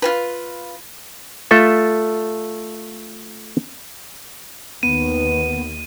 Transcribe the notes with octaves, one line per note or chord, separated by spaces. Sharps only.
F4 F#4 B4
A3 F4 A4 E5
D#2 D#3 B3 D#7